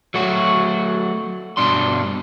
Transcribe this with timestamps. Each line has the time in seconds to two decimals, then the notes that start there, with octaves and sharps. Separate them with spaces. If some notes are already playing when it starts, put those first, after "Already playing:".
0.14 F#3 A3 F#4
1.57 G2 B2 D4 C6